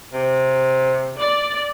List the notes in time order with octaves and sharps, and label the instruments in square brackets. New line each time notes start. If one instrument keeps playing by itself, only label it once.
[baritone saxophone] C3
[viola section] D5